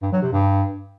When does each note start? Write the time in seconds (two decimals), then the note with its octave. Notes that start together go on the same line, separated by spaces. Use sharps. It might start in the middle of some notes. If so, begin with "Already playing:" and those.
0.03 G2
0.12 F#3
0.22 C3
0.32 G2